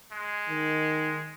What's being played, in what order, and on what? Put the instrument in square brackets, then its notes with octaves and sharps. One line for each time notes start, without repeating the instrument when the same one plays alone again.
[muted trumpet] G#3
[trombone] D#3